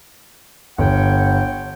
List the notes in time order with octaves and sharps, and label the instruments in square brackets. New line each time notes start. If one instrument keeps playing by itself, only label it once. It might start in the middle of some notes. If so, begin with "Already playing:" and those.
[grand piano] G1 [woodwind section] C#5 F#5 G5